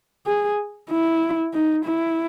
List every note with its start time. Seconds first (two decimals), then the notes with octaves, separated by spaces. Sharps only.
0.26 G#4
0.90 E4
1.54 D#4
1.85 E4